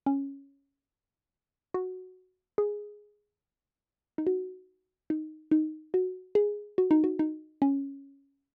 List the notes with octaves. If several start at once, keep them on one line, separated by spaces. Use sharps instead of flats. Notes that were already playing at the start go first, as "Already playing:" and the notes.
C#4
F#4
G#4
D#4
F#4
D#4
D#4
F#4
G#4
F#4
D#4
F#4
D#4
C#4